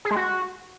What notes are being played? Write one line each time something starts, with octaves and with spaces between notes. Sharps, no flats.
G#4
G#3
F#4